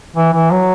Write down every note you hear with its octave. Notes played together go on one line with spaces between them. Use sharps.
E3
E3
F#3